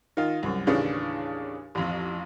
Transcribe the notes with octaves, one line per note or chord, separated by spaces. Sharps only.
D#3 F4
C2 F#2
D#2 A2 C#3 E3 D4
A1 F2